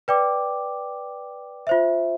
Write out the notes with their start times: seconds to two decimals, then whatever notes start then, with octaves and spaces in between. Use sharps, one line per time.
0.08 B4 D5 G5 D6
1.67 F4 C5 E5